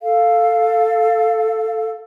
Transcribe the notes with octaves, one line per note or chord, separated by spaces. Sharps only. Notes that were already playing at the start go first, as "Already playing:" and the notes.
A4 F5